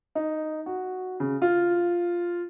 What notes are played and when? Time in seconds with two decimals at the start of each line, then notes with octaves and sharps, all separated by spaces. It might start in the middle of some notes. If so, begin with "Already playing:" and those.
0.15 D#4
0.66 F#4
1.20 C#3
1.42 F4